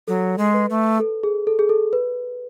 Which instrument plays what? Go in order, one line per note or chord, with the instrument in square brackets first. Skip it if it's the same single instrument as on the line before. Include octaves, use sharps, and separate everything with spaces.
[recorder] F#3 [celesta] A4
[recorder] G#3
[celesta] B4
[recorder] A3
[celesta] A4
G#4
A4
G#4
A4
B4